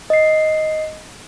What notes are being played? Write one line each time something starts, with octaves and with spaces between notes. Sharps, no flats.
D#5 C7